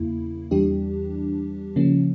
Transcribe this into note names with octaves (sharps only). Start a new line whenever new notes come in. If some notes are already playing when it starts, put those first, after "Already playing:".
Already playing: E2 C#3 A#3 E4
E2 E3 G3 D4 G4
C#3 F3 A#3 C#4